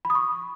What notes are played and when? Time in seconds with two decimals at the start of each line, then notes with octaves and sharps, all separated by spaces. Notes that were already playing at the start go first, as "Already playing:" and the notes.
0.05 B5
0.10 D#6
0.15 C#6